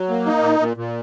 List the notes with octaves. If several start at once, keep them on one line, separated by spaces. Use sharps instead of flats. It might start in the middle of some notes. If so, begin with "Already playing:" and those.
Already playing: F#3
A#3
D#4
A#2
A#2
A#2